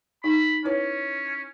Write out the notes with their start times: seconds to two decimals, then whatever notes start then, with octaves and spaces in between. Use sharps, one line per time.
0.24 D#4 B5
0.65 C#4 E4 B4 C#5